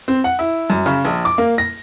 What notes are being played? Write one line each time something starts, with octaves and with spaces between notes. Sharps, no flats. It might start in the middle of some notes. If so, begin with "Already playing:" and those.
C4
F#5
E4
F#2
C#3
A#1
D6
A#3
A#6